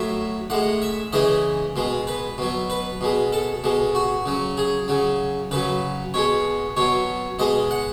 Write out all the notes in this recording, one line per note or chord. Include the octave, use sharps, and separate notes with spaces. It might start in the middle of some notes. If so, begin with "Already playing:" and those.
Already playing: A2 F#3 E5
A2 G#3 F#5
E5
C#3 E3 G#3 D#5
B2 G#3
B4
B2 F#3
B4
B2 G#3
A4
B2 G#3
F#4
C#3 F#3
G#4
C#3 F#3
C#3 F#3 B4
B2 G#3 C#5
B2 F#3 C#5
B2 G#3 D#5
F#5